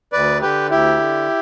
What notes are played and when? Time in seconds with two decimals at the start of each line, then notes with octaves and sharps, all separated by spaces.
0.13 D2 B4 D5
0.41 D3 G4 B4
0.70 D2 E4 G4
0.99 D3